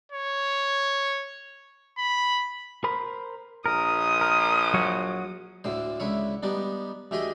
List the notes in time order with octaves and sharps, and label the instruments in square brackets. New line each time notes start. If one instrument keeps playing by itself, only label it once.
[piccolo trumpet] C#5
B5
[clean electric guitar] A#4 C5 B5
[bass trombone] A#1 [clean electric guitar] A#4 [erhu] D#6
[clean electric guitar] A#4
F#3 F#4 C#5
[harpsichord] D2 A2 D3 C5
C#2 D3 E4 C#5
G3 B3 D4 D#4
D2 A3 G4 G#4 D#5 C6